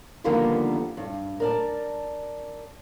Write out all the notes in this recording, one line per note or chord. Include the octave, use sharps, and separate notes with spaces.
D3 D#3 F3 G3 A#3 B3
G2
A#4 D5 A5